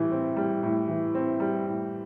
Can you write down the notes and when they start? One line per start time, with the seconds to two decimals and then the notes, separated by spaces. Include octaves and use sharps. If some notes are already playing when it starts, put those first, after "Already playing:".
Already playing: A2 E3 G3
0.12 C4
0.36 G3
0.63 A2
0.88 E3
1.15 C4
1.40 G3
1.66 A2